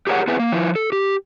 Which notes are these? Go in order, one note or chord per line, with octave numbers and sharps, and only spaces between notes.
G4 G#4 A#4 C5 C#5 F#5
B3 C4 E4 G#4 B4
A#3
F3 E4
A4
G4